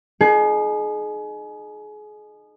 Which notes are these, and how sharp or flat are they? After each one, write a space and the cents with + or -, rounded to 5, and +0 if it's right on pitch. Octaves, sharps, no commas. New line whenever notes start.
D#4 -25 G#4 +30